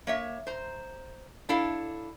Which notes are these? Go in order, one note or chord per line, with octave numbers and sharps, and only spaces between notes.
A#3 C#5 E5
C5 A#5
D4 E4 A4 F5